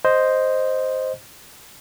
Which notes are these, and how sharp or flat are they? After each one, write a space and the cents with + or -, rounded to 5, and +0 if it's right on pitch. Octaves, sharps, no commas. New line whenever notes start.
C5 +0 D#5 +0